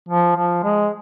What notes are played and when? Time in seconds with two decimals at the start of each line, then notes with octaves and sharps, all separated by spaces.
0.09 F3
0.36 F3
0.64 G#3